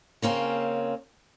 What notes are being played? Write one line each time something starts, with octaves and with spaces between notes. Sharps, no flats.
C#3 A#3 C4 C#4